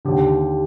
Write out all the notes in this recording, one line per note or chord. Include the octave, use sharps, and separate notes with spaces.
D#2 D3 G4